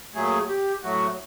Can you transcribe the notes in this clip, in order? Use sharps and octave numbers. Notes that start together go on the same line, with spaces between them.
A#2 F#3 A3 G#4
G4
A2 F#3 A3 F#4